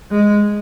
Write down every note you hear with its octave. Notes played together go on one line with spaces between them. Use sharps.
G#3